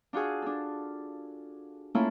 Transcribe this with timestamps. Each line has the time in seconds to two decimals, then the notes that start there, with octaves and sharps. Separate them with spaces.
0.13 D4 F4 F#4 G#4
0.42 D4 A4
1.95 A3 A#3 C#4 E4 F4 A4